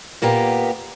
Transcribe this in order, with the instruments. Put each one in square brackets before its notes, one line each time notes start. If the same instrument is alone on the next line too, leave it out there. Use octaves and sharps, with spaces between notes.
[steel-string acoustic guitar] A#2 A#3 B3 G4